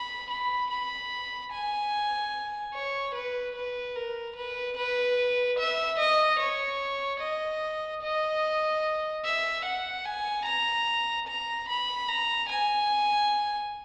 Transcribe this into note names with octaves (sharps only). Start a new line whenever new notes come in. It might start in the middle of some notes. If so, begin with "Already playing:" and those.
Already playing: B5
B5
B5
G#5
C#5
B4
B4
A#4
B4
B4
E5
D#5
C#5
D#5
D#5
E5
F#5
G#5
A#5
A#5
B5
A#5
G#5